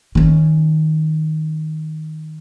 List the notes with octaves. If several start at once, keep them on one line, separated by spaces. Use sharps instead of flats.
D#3 C#4